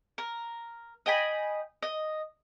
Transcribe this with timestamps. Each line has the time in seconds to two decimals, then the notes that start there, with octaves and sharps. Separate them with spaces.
0.18 A#4
1.06 D#5 G5 G#5 B5
1.83 D#5